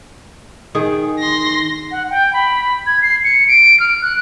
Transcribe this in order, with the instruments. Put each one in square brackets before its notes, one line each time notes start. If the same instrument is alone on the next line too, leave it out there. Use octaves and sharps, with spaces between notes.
[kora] D#3 G#4
[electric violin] C6 A#6
[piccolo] F#5
G5
B5
G#6
C7
C#7
D7
F6
F#6